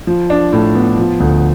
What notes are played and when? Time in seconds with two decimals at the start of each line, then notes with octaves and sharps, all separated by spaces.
0.07 F3
0.30 D4
0.53 A2
0.75 B3
0.98 F3
1.20 D2